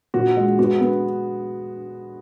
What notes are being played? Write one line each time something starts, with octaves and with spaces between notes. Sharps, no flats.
A#2 F#4
G#3
B3 F#4
B3